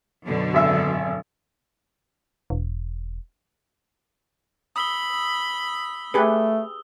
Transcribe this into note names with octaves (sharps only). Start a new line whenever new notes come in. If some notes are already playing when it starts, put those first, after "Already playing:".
F#2 B2 D3
G#1 E5 E6
E1
B5 D#6 E6 G7
A3 G4 G#4 B4